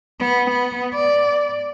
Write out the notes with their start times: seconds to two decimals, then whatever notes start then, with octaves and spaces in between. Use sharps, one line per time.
0.20 B3
0.50 B3
0.94 D5